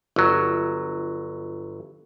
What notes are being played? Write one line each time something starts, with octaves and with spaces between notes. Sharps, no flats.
G1 F#3